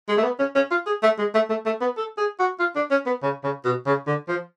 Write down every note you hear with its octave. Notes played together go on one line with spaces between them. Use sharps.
G#3
A3
B3
C#4
C#4
F4
G#4
A3
G#3
A3
A3
A3
B3
A4
G#4
F#4
F4
D4
C#4
B3
C#3
C#3
B2
C#3
D3
F3